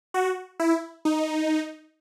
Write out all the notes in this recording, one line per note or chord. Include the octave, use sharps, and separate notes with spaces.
F#4
E4
D#4